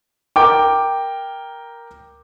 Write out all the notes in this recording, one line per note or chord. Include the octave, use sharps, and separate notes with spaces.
A#4 G5 D6